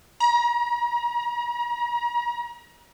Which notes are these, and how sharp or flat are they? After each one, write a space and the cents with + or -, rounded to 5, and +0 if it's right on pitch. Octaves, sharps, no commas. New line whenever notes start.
A#5 +35